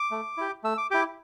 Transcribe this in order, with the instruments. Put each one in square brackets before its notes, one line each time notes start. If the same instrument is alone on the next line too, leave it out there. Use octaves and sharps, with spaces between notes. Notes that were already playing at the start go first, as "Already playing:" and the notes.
Already playing: [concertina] D6
A3
E4 G4
A3 E6
D6
E4 G4 D6